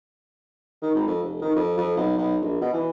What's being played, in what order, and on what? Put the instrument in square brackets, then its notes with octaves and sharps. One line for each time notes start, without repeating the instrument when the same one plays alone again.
[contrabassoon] D#3
G#1
F2
F1
D#3
F2
F2
B1
B1
A#1
B2
E3